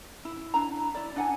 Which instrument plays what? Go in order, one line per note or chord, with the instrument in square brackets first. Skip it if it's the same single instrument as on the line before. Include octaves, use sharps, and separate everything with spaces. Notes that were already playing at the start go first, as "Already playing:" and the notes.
[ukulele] E4
D4 E4 A#5
E4 D5
D4 F#5 G#5